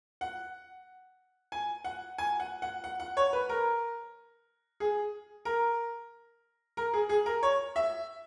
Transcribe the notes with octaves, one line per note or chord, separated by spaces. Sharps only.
F#5
G#5
F#5
G#5
F#5
F#5
F#5
F#5
C#5
B4
A#4
G#4
A#4
A#4
G#4
G#4
A#4
C#5
E5